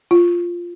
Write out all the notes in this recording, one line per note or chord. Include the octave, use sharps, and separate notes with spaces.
F4